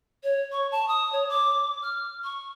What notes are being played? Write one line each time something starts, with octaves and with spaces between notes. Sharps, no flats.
C#5
C#6
A5
D#6
C#5
D6
F6
C#6